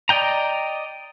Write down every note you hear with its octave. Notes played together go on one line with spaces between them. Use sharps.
D5 D#5 G5 A#5